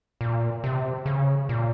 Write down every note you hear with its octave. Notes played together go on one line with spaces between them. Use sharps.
A#2
C3
C#3
A#2